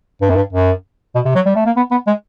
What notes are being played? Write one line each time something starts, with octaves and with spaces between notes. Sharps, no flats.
G2
F#2
G2
F#2
B2
C3
F#3
G3
A3
A#3
B3
B3
G#3